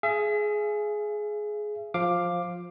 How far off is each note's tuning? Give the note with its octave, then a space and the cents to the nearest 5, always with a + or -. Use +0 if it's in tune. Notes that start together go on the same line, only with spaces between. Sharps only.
G#4 +15 E5 +40
F3 +15 F5 +0 D6 +10